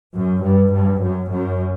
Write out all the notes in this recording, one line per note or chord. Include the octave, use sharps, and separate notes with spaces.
F#2
G2
G2
F#2
F#2